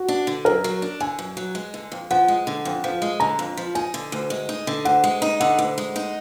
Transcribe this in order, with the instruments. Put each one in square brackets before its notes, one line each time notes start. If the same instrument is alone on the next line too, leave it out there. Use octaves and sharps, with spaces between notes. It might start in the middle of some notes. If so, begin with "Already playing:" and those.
Already playing: [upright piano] F#4
[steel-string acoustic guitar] D4
D3
[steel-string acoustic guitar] F#2 [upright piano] A#4
[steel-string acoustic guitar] F#3
D4
[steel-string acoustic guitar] D3 [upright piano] G#5
[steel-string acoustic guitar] F#2
F#3
G#3
D3
F2
[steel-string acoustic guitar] F3 [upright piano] F#5
[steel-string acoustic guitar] G#3
D3
F2
F3
G#3
[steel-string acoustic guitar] D3 [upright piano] A#5
[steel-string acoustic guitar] F2
F3
[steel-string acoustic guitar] D#4 [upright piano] G#5
[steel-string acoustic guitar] D3
D2
G#3
D#4
D3
[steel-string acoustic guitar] D2 [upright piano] F#5
[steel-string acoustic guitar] G#3
D#4
[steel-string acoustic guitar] D3 [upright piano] F#5
[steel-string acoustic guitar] D2
G#3
D#4